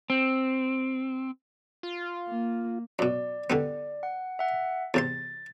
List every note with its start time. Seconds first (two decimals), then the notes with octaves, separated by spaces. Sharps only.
0.10 C4
1.83 F4
2.28 A#3
2.99 F#2 B2 D5
3.50 D3 G3 B3
4.03 F#5
4.39 E5 F#5
4.94 E2 C3 C6 A6